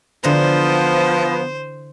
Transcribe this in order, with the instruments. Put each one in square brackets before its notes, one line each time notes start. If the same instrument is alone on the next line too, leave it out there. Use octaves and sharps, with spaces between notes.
[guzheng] D3 E3 A#5 [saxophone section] F3 B3 [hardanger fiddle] C5